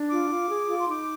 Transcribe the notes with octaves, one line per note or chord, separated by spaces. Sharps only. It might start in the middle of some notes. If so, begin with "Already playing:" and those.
Already playing: D4
F4 D6
F4
G#4
F4
C6
D#4 D6